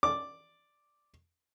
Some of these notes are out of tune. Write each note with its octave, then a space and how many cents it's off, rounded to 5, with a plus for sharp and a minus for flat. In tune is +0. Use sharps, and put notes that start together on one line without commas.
D5 +0 D6 +0